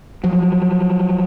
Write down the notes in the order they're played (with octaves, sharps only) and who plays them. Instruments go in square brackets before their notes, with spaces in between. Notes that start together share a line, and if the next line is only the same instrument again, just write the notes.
[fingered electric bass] F3 F#3